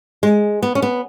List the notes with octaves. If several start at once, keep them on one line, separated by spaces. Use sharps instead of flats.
G#3
B3
C#4
B3